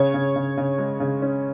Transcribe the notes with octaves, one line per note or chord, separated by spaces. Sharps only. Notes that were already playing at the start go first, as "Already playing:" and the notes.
Already playing: C#3 C#5
C#3
C#3
C#3
G#3
C#3
C#4